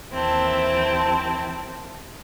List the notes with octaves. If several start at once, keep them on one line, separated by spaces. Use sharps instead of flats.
D#2 E3 C4 E4 A5